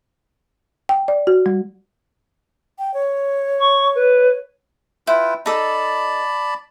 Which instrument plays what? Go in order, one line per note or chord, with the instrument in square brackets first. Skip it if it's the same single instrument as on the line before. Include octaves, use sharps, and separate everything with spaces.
[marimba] G5
D5
F#4
G3
[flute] G5
C#5
[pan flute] C#6
B4
[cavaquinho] E4 [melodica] F4 B4 G5
[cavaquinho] D#4 A4 [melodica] D5 A5 B5